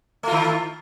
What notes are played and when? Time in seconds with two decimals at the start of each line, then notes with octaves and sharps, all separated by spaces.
0.23 A3
0.27 F4
0.31 D#3